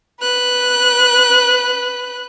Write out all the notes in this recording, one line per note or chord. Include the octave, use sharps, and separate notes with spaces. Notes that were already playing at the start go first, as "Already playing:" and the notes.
B4 F#6